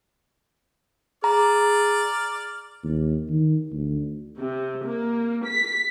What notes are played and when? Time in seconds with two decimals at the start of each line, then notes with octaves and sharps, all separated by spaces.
1.24 G#4 D5 A#5 F6
2.84 D#2
3.30 D#3
3.72 D2
4.38 C3
4.84 A#3
5.46 B6